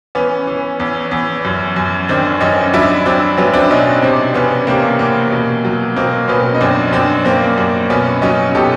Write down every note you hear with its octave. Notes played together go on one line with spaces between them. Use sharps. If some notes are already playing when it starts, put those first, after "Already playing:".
E3 B3 C#4
E3
E2
E2
F#2
F#2
D#3 C4 D4
F#2 C#4 D#4
F#3 D4 E4
F#3 C4 D4
F#3 B3 C#4
C4 D4
B2 C#4 D#4
C3 C4 D4
E2 B3 C#4
C3 A#3 C4
E2 A#3
B2
F#3
B2 A#3 C4
B2 B3 C#4
D#4
F#2 C4 D4
C#4
F#2 C4 D4
F#2 A#3 C4
F#2
B2 B3 C#4
F#3 C#4 D#4
B2 G4 A4